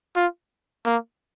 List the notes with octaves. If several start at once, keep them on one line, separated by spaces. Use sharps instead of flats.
F4
A#3